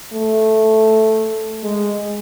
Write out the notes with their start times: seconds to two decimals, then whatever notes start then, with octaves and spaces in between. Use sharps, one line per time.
0.13 A3
1.63 G#3